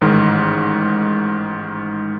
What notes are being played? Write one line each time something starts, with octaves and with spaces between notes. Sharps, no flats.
A1 G#2 D#3